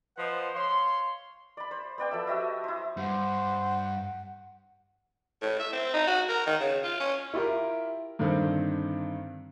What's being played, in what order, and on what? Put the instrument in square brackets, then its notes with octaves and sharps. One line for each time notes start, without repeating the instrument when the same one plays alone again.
[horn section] F3 B4 C5 D#5 F#5
C#5 F5 C6
[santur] D5 B5
C5
B3 D5 G5 D6
F3 A4 E5
F#4 G4 D#5 E5
E4 C5
[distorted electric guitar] G2 [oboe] C5 [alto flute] F#5
[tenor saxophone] A2
E5
C4
D#4
F#4
A#4
D#3
C#3
F4
C#4
[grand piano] E4 F4 G4 A#4
G2 D3 D#3 C4